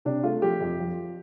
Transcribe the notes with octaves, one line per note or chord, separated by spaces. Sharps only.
C3 D4
A3 F4
F3 G4
F2
F3